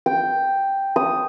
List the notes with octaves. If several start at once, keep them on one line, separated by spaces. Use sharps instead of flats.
G5
D#6